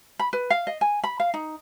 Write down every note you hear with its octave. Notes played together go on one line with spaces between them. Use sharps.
B5
B4
F5
D#5
G#5
B5
F5
D#4